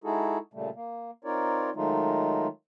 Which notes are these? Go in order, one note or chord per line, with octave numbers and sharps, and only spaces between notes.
G#3 D#4 E4 F#4 G#4 A4
A#2 C#3 G3 A3
A#3
C4 D#4 F4 A#4 C#5 D5
D#3 F#3 G#3 A3 D#4 F4